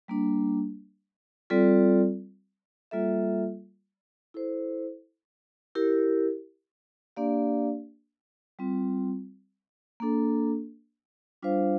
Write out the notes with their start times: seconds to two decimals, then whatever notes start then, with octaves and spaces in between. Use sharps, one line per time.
0.08 G3 A#3 D4
1.50 G3 C4 F4 A4 D5
2.91 G3 A#3 F4 A4 E5
4.34 E4 A4 C5
5.75 E4 G4 A#4
7.17 A#3 D4 G4 D5 F5
8.59 G3 C4 F4
10.00 A#3 D4 A4
11.43 G3 D4 F4 C5 F5